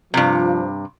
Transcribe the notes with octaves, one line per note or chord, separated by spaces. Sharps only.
G2 C3 F3